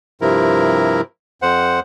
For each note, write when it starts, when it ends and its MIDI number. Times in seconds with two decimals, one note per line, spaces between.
0.21 1.01 43
0.21 1.01 48
0.21 1.01 53
0.21 1.01 64
0.21 1.01 70
1.42 1.80 41
1.42 1.80 72
1.42 1.80 78